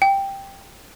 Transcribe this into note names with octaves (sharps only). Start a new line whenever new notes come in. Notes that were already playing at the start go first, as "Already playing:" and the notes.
G5